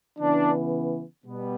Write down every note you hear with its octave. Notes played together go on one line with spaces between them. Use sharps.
C#3 E3 B3 D4
B2 G3 B3